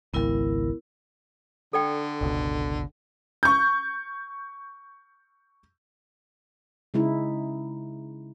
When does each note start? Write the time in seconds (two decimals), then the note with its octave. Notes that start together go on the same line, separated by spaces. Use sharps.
0.14 G#1 C#2 B3 E4 A#4
1.73 D3 A4 D5 G5
2.21 G1 C#2 B2
3.43 C#6 G6
6.94 C#3 G#3 D#4 E4